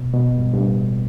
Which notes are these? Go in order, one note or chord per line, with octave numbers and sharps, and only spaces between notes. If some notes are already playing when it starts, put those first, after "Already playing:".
Already playing: B2
B2
G2
G2
A2